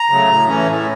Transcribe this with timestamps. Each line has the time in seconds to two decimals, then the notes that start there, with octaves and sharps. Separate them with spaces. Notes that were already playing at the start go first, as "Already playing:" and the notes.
Already playing: A#5
0.10 C#3 F#3 A3
0.30 A2
0.48 E3 A3 C#4
0.68 A2